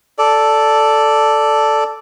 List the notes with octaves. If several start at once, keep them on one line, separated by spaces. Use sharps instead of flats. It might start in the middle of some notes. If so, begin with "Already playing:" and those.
A4 D5